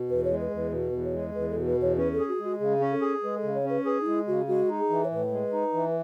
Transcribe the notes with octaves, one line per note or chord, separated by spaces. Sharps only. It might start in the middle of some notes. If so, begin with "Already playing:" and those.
Already playing: B2
E2 B4
C#5
G#3
B4
E2
B4
B2 B4
E2
C#5
G#3
E2 B4
B2 A4
B4
E2 C#5
C#4 B4
A4
G#4
F#4
G#3 F#4
C#3 G#4
C#4
A4
G#4
G#3 B4
A4
C#3
C#5
C#4 B4
G#4 B4
D#4
G#3 E4
C#3 F#4
G#3 F#4
D#4
G#4
E3
C#5
A2 B4
G#3
D#4
E3